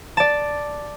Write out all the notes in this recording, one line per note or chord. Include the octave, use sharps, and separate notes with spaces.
D5 A5